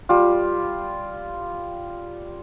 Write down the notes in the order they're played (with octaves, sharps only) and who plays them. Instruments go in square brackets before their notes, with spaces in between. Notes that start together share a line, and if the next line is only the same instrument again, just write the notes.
[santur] G3 F4